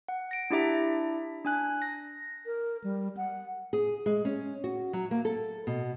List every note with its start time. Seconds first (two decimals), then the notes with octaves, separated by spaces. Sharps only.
0.09 F#5
0.31 A#6 D7
0.50 D4 E4 G4 E5 A#5
1.45 D4 G#5 F#6
1.82 A#6
2.46 A#4
2.84 G3
3.17 F#5
3.73 G#4
4.06 G#3
4.25 C#4
4.64 F#4
4.93 F#3
5.11 A#3
5.25 A4
5.67 B2